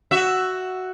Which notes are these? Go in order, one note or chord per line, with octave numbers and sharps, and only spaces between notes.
F#4 E5